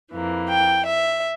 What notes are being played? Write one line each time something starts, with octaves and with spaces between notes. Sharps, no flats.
F2 E3 A#3
G5
E5